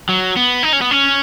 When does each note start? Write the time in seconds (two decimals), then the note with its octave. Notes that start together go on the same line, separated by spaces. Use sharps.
0.09 F#3
0.36 B3
0.63 D#4
0.73 C#4
0.81 B3
0.91 C#4